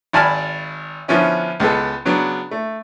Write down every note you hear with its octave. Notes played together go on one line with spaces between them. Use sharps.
G#1 D5 G#5 A5 B5 F6
D3 F3 B3 C#4 E4
C#2 G#3 B3 A4
C#3 F#3 B3 D4
A3